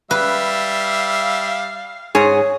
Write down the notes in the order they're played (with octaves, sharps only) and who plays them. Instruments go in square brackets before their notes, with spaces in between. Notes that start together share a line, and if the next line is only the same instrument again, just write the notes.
[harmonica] G3 E5 [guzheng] B4 [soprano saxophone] F5
[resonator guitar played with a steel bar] G#2 G#4 [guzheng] C#5